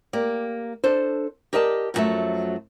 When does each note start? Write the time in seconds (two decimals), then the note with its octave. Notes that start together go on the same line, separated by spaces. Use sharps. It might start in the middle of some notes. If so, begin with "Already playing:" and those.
0.13 A#3 G4 D5
0.84 D4 A4 C5
1.53 G4 A#4 D5 D#5 G#5 A5
1.94 F#2 A#2 F3 F#3 A3 E5